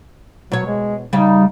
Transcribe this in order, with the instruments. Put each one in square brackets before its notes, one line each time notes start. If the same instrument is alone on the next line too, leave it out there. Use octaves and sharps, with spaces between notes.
[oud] B2 C#5 [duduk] F#3
[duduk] G#3
[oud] C#3 G3 [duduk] D#4